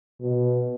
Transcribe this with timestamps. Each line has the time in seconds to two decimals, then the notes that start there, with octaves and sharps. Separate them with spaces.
0.20 B2